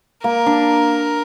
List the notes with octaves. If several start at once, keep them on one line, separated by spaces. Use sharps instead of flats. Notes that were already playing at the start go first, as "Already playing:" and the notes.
A#3 A#4
D4